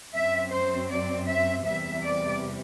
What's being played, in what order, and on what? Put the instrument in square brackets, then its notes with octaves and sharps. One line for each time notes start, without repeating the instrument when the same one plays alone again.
[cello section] F#2 F#3 C4 E5
C5
D5
E5
E2 C3 G3 E5
D5